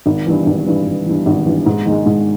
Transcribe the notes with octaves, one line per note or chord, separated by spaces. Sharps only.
G#1
G2 E3
G#1
G2 E3
G#1
G2 E3
G#1
G2 E3
G#2
D#3 G#3
G#2